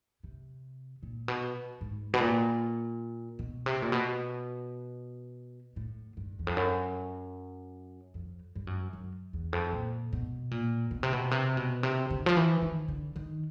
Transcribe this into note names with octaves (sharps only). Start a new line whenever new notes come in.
C3
A#2
B2
G#2
B2
A#2
B2
C3
A#2
B2
A2
G2
E2
F2
F#2
F2
G2
F#2
F#2
E2
F2
A#2
B2
A#2
B2
C3
B2
C3
B2
C3
D3
F3
E3
D#3
D3
D#3